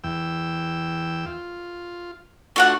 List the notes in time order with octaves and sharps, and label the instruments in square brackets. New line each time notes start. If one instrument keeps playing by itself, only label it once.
[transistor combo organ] E2 G5 E6
F4
[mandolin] A3 F#4 F#5 [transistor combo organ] D4 F4